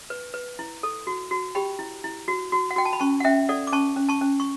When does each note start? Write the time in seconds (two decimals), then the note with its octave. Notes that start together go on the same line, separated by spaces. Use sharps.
0.10 B4
0.34 B4
0.59 E4
0.83 A4
1.07 F#4
1.31 F#4
1.55 G4 G5 B5
1.79 E4
2.04 E4
2.28 F#4
2.52 F#4
2.71 F#5
2.76 F#4 G5
2.85 A5
2.93 B5
3.00 C#4 A5 C#6
3.20 F#5
3.25 C#4 E5 G5
3.49 A4 D5 F#5
3.67 D6
3.73 C#4 A5 C#6
3.96 C#4
4.09 A5 C#6
4.21 C#4
4.40 C#6